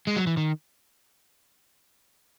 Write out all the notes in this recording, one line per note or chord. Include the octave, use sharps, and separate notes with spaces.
G#3
F#3
E3
D#3